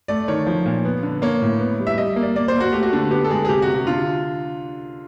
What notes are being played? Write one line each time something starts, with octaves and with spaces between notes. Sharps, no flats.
A3 D5
D#3 C#5
F3
A#2
B3
D3
A#3 C#5
A2
B3
G3
E5
G3 D#5
A#3
D5
A#3 D5
C5
A#3
F#4
A3 G4
F#4
D3
B3 G4
A4
G#3 G#4
G#4
C3 G4
F#4
C3
F#4
D3 F4